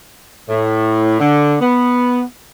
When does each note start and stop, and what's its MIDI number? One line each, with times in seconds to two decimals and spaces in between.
0.49 1.18 45
1.20 1.56 50
1.61 2.22 59